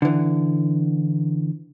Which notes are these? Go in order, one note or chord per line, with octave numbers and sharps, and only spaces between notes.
D3 E3